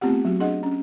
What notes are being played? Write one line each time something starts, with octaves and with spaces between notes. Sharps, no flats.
A3 B3 C4 F4 G4 F#5
F#3 F#4
D4 G#4 D#5 F#5
C#4